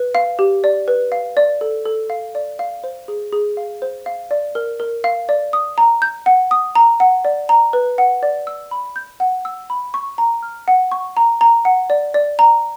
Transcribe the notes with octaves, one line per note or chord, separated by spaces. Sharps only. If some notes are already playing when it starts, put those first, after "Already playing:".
Already playing: B4
F5
G4
D5
B4
F5
D5
A4
A4
F5
D5
F5
C5
G#4
G#4
F5
C5
F5
D5
A#4
A#4
F5
D5
D#6
A#5
G6
F#5
D#6
A#5
F#5
D5
A#5
B4
F#5
D5
E6
B5
G6
F#5
E6
B5
C#6
A#5
F6
F#5
C#6
A#5
A#5
F#5
D5
D5
A#5